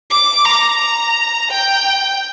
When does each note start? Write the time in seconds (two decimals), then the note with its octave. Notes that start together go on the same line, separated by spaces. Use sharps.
0.11 D6
0.45 A#5
0.80 A#5
1.50 G5